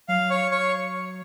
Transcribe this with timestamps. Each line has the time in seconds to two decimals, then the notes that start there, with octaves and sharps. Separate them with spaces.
0.08 F#3 F5
0.30 C#5
0.51 C#5